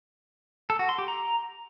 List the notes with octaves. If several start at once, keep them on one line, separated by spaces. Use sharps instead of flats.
A4
F#4
C6
G4
A#5